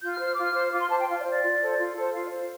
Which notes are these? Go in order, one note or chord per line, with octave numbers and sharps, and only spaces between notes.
F4 G6
F6
C5
F6
F4 D6
F6
C5
F4 D6
C6
C5 A5
G5
F4 F5
D5
C5
D5
F4
A4 C5
F4
A4 C5
F4 F5
D5
C5